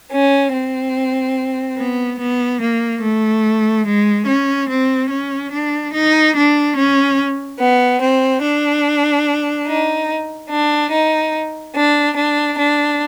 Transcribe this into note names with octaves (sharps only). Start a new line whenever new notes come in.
C#4
C4
B3
B3
A#3
A3
G#3
C#4
C4
C#4
D4
D#4
D4
C#4
B3
C4
D4
D#4
D4
D#4
D4
D4
D4